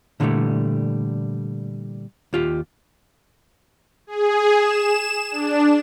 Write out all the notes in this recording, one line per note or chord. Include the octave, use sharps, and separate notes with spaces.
A#2 D3 E3 F#3 G3 A3
D#2 F4 G4
G#4
E7
D4